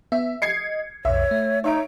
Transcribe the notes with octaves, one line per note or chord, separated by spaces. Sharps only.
B3 E5
D#5 G#6 C7 C#7
B1 F2 C#5 E5
A3
D#4 C#5 E5 D7